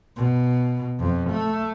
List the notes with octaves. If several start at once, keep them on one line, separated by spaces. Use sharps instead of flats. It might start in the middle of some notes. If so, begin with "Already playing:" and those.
B2
F2
A3